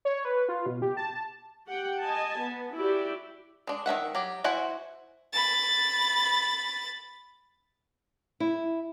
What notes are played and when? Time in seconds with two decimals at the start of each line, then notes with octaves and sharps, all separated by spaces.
0.05 C#5
0.25 B4
0.49 F4
0.66 B2
0.82 G4
0.97 A5
1.67 G4 F#5 G5
2.01 D#5 G#5 A5
2.39 B3
2.75 E4 F#4 G4 D5
3.67 G#3 D4
3.86 D#3 C#4 E5 F#5
4.15 F#3 G4
4.44 E4 F#4 C5 F#5 G#5
5.33 B5 A6
8.40 E4